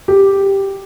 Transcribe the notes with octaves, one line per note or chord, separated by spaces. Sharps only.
G4